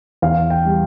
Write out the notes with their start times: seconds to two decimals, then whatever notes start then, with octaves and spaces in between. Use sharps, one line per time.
0.22 E2 F5
0.50 G5
0.65 G3